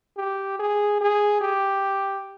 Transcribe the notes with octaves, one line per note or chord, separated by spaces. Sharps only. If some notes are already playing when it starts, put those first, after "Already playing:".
G4
G#4
G#4
G4